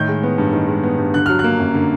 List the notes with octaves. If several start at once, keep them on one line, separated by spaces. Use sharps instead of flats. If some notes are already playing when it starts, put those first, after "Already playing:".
Already playing: A2 D#3 G6
G#3
B3
G2
D#3
G#3
B3
G2
D3 F#6
F#3 F6
F#6
A#3
F#2
D3